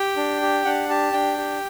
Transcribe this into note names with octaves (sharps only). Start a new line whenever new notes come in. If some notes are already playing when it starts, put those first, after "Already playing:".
Already playing: G4 G5
D4
G4
D4 F#5
G4 A5
D4 G5
G4